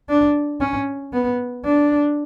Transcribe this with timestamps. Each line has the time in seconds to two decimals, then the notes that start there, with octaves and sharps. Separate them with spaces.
0.09 D4
0.60 C#4
1.13 B3
1.65 D4